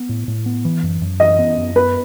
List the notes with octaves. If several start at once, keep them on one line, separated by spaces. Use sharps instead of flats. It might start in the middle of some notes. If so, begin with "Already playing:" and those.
Already playing: B3
A2
A2
B3
E3
F#2
F#2
E3 D#5
B3
F#2
B3 B4